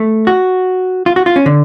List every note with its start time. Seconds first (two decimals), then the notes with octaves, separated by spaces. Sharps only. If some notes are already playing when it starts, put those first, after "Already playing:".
Already playing: A3
0.27 F#4
1.06 F4
1.16 F#4
1.26 F4
1.36 C#4
1.46 D3